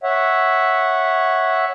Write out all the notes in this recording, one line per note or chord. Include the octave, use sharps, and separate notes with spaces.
C#5 E5 F#5